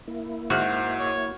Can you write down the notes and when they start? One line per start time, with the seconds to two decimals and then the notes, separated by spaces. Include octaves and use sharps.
0.07 A#3 E4
0.50 G#2 F#4 C5 E5 F6
0.99 C#5